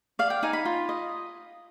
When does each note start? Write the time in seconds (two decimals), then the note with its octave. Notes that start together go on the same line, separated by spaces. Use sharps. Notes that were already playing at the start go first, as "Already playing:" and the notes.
0.19 D5 F5
0.30 G5
0.43 D#4 G#5
0.53 B5
0.65 F4
0.89 D#5